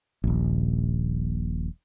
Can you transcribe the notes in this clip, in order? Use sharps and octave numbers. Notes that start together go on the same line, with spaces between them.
D#1 A#1